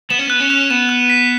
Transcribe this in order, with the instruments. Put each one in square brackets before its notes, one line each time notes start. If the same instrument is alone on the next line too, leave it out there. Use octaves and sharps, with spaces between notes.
[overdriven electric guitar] B3 [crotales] E7
[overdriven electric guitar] C#4
[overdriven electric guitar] B3 [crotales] F#6
[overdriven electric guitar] C#4
[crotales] F#6
[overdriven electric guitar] B3 [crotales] E7
[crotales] F#6
B6